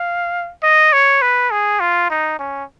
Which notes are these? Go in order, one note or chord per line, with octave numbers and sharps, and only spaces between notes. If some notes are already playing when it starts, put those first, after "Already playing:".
Already playing: F5
D#5
C#5
B4
G#4
F4
D#4
C#4